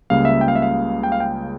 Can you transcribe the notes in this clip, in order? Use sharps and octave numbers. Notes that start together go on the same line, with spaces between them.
C#2 C#3 G3 A#3 F5
E5
G5
F5
E5
F5
G5
F5
G5